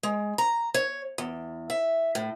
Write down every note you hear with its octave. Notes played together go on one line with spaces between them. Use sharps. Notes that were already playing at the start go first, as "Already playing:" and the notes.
G#3
A#5
C#5
E2
E5
A2